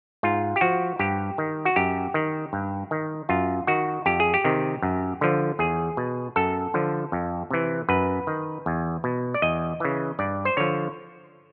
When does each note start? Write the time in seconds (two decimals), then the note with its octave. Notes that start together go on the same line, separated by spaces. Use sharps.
0.23 G#2 F4
0.56 G4
0.61 F3 F#4
0.99 G2 G4
1.38 D#3
1.65 F#4
1.76 F#2 G4
2.14 D#3
2.53 G2
2.91 D#3
3.29 F#2 F4
3.67 D#3 F#4
4.06 F2 G4
4.20 G#4
4.34 G4
4.45 C3 D#3
4.82 F#2
5.21 D3 F3
5.59 E2 G#4
5.97 B2
6.36 F#2 A4
6.74 D3 F3
7.12 F2
7.50 C3 E3
7.89 F#2 B4
8.27 D#3
8.66 E2
9.04 B2
9.34 D5
9.42 E2 D#5
9.80 C#3 E3
10.19 G2 D5
10.45 C5
10.57 D3 F3 C#5